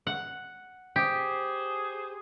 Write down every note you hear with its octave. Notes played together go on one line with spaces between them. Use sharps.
F#5
G4 G#4 C5